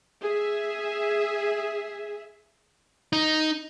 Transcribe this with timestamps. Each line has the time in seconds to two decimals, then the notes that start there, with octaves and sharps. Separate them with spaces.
0.22 G#4 E5
3.13 D#4